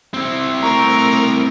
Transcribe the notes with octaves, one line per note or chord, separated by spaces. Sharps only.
C4 E4
A3 A#4 A#5 C#6